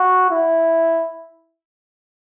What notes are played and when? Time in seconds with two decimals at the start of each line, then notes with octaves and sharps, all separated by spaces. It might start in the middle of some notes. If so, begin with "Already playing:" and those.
Already playing: F#4
0.31 E4